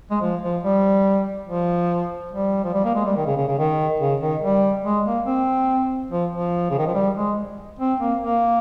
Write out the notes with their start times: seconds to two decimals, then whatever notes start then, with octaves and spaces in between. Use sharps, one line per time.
0.11 G#3
0.21 F3
0.42 F3
0.63 G3
1.48 F3
2.31 G3
2.64 F3
2.74 G3
2.85 A#3
2.95 G#3
3.05 G3
3.16 D#3
3.26 C#3
3.37 C#3
3.48 C#3
3.58 D#3
4.00 C#3
4.21 D#3
4.42 G3
4.85 G#3
5.05 A#3
5.26 C4
6.11 F3
6.32 F3
6.70 C#3
6.78 D#3
6.87 F3
6.95 G3
7.16 G#3
7.79 C4
8.00 A#3
8.21 A#3